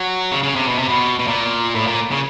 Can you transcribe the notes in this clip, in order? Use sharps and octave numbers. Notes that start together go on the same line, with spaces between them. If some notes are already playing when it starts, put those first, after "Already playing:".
Already playing: F#3
C#3
C#3
C3
B2
C3
B2
B2
A#2
A2
A#2
C#3